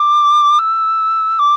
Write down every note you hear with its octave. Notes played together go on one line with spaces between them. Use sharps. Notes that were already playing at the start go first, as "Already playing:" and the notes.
Already playing: D6
E6
D6